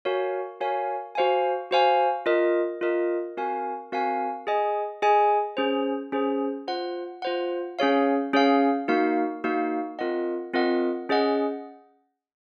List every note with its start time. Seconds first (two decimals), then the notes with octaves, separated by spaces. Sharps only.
0.05 F#4 A#4 C#5 F5 G#5
0.61 F#4 A#4 C#5 F5 G#5
1.15 F#4 C5 F5 G#5
1.71 F#4 C5 F5 G#5
2.26 F4 A#4 D#5
2.81 F4 A#4 D#5
3.37 C4 F#4 A#4 F5 G#5
3.92 C4 F#4 A#4 F5 G#5
4.47 G#4 D#5 G#5
5.02 G#4 D#5 G#5
5.57 C#4 G#4 C5
6.12 C#4 G#4 C5
6.67 F4 C5 F#5
7.22 F4 C5 F#5
7.79 C#4 G#4 C#5 F5
8.33 C#4 G#4 C#5 F5
8.88 A#3 D#4 F#4 A#4 F5
9.44 A#3 D#4 F#4 A#4 F5
9.99 C4 F4 A#4 D#5 F#5
10.53 C4 F4 A#4 D#5 F#5
11.09 C#4 G#4 D#5 F#5